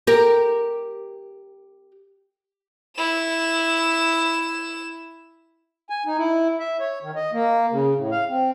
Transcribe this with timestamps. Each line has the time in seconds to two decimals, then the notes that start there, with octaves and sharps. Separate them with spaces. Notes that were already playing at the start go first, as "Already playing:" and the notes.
0.07 G4 A#4
2.96 E4 E7
5.90 G#5
6.06 D#4
6.18 E4
6.59 E5
6.80 C#5
7.03 D#3
7.15 D#5
7.33 A#3
7.72 C#3
7.97 A2
8.11 F5
8.29 C4